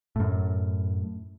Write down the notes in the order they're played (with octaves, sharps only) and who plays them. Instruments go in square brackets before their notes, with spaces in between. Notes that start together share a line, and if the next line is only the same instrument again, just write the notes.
[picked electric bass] F#2 A2